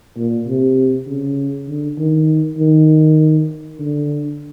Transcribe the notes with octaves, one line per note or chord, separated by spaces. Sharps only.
A#2
C3
C#3
D3
D#3
D#3
D3